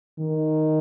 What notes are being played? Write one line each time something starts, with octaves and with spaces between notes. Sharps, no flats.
D#3